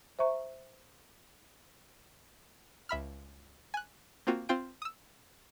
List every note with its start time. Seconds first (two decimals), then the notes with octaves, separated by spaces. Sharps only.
0.19 C5 E5 A#5 C#6
2.89 C#2 E5 B5 F6
3.74 G#5 F#6
4.27 A#3 C4 F4 F#4
4.49 C4 F4 G5 D7
4.82 D#6 E6